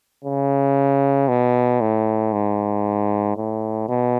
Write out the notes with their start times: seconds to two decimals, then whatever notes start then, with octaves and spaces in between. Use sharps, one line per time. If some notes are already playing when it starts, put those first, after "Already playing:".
0.24 C#3
1.28 B2
1.81 A2
2.33 G#2
3.37 A2
3.89 B2